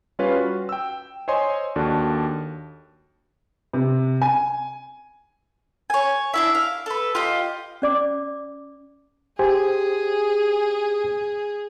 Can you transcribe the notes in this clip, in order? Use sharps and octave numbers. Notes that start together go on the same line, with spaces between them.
G3 C#4 F4 B4 C#5 F5
F#4
G5 E6
C5 C#5 D#5 G#5 C6
D#2 D4 F#4 A4 D5
C3
G#5
C#5 G#5
D4 E4 E5
F5
A4 B4
F4 G4 D#5
C#4 D5 D6
G4 G#4 C5 G#5